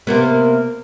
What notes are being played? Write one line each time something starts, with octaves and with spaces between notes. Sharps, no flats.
C3 A#3 B3